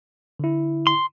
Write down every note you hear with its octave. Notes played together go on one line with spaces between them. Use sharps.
D3 E4
C6